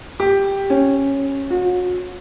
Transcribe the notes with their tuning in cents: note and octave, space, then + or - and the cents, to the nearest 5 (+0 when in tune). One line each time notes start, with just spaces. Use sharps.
G4 +5
C#4 -10
F#4 -40